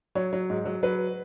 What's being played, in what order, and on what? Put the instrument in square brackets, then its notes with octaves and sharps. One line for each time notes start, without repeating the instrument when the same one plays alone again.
[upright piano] F#3 C#5
F#3
G#2
F#3
F#3 B4